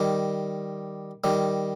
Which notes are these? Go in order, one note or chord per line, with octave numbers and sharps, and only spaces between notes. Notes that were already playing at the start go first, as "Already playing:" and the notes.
Already playing: D#3 G3
D#3 G3